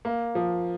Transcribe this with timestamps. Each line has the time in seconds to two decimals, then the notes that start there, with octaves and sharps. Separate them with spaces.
0.05 A#3
0.35 F3